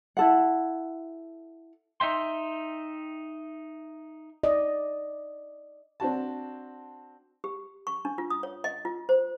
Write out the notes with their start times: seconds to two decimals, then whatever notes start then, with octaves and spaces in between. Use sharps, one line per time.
0.17 E4 A4 F#5
2.00 D#4 E5 G5 C6
4.43 D5 D#5
6.00 C4 D4 F#4 A5
7.44 G4
7.87 C#6
8.05 D4
8.18 F4
8.30 D#6
8.43 C#5
8.64 D#5
8.85 F4
9.09 C5